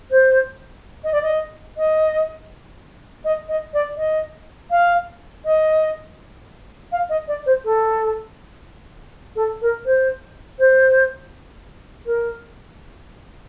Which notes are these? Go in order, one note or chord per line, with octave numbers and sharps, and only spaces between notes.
C5
D#5
D5
D#5
D#5
D#5
D#5
D5
D#5
F5
D#5
F5
D#5
D5
C5
A4
A4
A#4
C5
C5
A#4